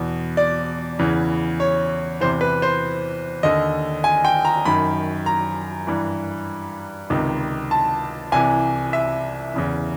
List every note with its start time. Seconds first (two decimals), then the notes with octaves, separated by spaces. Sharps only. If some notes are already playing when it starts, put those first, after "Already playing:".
Already playing: E2 B2
0.37 D5
0.99 E2 C#3 E3
1.60 C#5
2.20 E2 C3 E3 C5
2.41 B4
2.62 C5
3.43 D#2 D3 D#5
4.04 G#5
4.25 G5
4.45 A#5
4.65 F#2 D#3 B5
5.26 A#5
5.87 G2 E3
7.10 C#2 C3 D#3
7.71 A5
8.32 C2 C3 E3 G#5
8.93 E5
9.54 E2 C#3 E3